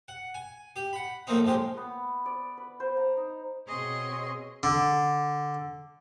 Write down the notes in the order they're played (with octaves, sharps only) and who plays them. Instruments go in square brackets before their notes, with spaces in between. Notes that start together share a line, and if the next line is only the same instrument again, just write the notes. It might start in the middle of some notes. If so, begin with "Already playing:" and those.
[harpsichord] F#5
G#5
G4
F#5 B5
A2 F3 A3 A#3 C4 D#4
A#1 F3 G#3 G4
[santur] B3
D5
B4
C5
A#5
D#4
[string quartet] B2 C4 G#4 C#5 D#5 C6
[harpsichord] D3